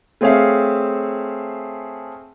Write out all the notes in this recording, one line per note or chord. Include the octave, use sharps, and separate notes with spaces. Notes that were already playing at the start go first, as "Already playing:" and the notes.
A3 C4 G#4 C#5 E5 F5